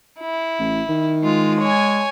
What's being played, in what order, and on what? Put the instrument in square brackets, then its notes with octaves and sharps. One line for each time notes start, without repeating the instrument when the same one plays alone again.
[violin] E4
[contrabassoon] A1
D#3
[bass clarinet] G#3 [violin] F4
[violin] C#5 G#5